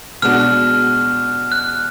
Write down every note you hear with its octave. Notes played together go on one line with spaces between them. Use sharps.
B2 G#3 B3 D4 F#4 F6
F#6